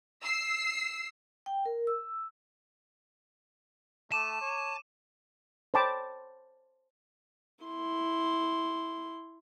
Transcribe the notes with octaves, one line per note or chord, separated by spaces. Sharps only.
E6 C7
G5
A#4
E6
A3 A5 D6 D#7 E7
C#5
C5 C#5 G5 A5 B5 D6
E4 C6